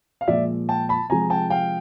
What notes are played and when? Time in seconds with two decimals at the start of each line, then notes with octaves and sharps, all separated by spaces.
0.21 F5
0.28 A#2 F3 G#3 D5 E5
0.69 G5 A5
0.89 A5 B5
1.10 C3 F3 G#3 G#5 A#5
1.30 G5 A5
1.50 F5 G5